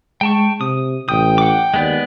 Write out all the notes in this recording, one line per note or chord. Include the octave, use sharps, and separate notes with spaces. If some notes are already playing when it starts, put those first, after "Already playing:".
G#3 G5 A5 C#6
C3 D#6
A1 G5 D#6
F#5 D6
D#2 G#3 B3 D5